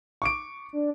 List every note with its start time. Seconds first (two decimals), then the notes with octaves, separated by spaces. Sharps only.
0.22 C#6 D6 D7
0.73 D4